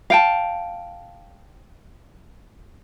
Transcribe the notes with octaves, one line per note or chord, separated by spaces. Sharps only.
F5 G5 A5